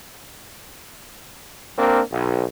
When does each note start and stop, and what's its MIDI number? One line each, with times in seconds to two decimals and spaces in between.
1.77 2.00 58
1.77 2.00 60
1.77 2.00 62
1.77 2.00 70
2.11 2.43 35